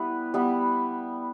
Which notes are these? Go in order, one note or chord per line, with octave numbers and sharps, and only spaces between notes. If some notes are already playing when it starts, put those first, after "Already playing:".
Already playing: G3 B3 E4 B4
G3 B3 E4